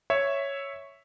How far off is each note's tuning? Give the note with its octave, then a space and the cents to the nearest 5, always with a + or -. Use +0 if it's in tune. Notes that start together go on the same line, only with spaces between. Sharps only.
C#5 +0 E5 +0